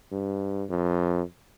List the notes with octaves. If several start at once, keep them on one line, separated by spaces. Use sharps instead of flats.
G2
F2